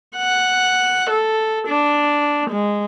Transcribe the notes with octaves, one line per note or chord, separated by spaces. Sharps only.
F#5
A4
D4
G#3